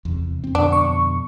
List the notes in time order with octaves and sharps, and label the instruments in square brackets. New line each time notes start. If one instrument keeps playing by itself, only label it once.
[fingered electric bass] E2 C3
F#2 C4
[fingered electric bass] F2 B2 D3 [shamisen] D4
[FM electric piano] C#6